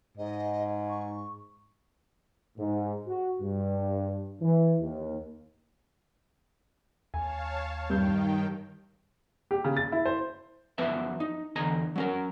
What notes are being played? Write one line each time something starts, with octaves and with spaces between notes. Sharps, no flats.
G#2 D#5
C#6
G#2
F#4
G2
E3
D#2
D#2 C#5 F5 G#5 A5
G2 D#3 G5 G6
G4
C#3
A6
E4
C5
F#2 F3 B3 B4 C5 E5
D#4
E2 D3 D#5 G#5 A#5
F#3 C#4 A#4